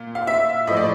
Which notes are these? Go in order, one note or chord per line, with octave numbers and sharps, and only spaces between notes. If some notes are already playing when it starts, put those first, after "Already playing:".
Already playing: A#2
F5
E5
A2 F3 D#5
D5